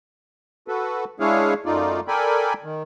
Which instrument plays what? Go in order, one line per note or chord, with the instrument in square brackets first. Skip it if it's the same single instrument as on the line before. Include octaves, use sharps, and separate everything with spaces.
[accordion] F#4 A4 B4
G#3 D4 E4 G#4 C#5 F5
F#2 A3 D#4 F4 D5
A4 A#4 D5 G5 G#5 B5
D#3